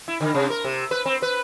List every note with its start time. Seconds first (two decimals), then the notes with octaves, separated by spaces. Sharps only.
0.08 E4
0.21 D3
0.34 C3
0.50 A#4
0.65 C3
0.91 B4
1.06 C4
1.22 B4